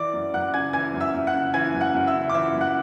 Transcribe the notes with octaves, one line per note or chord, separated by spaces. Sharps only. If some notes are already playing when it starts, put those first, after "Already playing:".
Already playing: E3 D5 D6
F#2
F#2 F#5 F#6
C#3 G#5 G#6
E3 G#5 G#6
F#2
E5 E6
F#2
F#5 F#6
C#3
E3 G#5 G#6
F#2
F#5 F#6
F#2
E5 E6
C#3
D6
E3 E5 E6
F#2
F#5 F#6